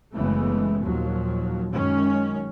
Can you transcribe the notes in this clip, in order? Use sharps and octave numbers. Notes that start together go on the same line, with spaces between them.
F#1 C#3 E3 G#3 A3 B3
D#2 A#2 F3 F#3
F#2 D#3 G#3 C#4